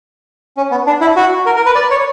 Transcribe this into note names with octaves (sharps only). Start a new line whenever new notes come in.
C#4
B3
D4
E4
F#4
A#4
A#4
B4
D5
C#5